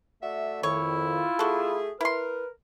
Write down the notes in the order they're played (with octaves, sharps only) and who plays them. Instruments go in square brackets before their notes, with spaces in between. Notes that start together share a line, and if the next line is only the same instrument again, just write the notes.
[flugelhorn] A3 [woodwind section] F#4 D5 E5
[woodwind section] F2 D#3 [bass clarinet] E4 [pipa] C#5
[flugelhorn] F4
[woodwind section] A3 G#4 [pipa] F#4 A4
[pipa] E4 C6 [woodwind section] A#4 [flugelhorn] B4